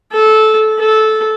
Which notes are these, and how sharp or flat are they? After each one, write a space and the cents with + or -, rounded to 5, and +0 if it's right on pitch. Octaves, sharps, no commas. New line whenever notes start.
A4 -15
A4 -15